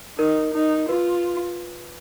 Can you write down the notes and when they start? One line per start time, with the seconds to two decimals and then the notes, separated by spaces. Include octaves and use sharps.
0.18 D#4 A#4
0.54 D#4
0.89 F4 B4